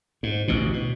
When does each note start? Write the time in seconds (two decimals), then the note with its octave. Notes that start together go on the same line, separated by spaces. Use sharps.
0.23 G#2
0.48 A1 D2 B2
0.73 B2